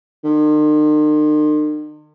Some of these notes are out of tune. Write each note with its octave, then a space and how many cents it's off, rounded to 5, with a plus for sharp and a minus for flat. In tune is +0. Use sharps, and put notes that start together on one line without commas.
D#3 -45